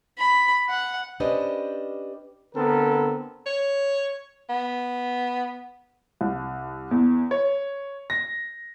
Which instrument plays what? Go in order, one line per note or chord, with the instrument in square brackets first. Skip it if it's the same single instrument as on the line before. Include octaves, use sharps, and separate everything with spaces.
[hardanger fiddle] B5
F#5
[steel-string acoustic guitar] C#4 D4 G4 B4 C5 D#5
[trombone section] D3 B3 C4 A4 A#4
[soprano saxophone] C#5
B3
[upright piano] C2
E2
C#5
A#6